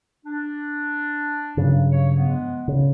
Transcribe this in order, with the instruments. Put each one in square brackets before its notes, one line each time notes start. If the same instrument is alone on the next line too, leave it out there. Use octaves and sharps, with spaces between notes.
[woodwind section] D4
[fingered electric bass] G2 C#3 F#3
[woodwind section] C#5
F3 G#3 B3
[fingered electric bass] C#3